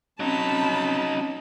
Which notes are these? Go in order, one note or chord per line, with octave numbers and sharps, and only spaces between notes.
F#3 C4 C#4 D#4 A5 B5